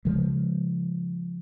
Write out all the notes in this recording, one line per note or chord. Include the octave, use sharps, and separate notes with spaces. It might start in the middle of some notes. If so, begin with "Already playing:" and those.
C#3 F3 G#3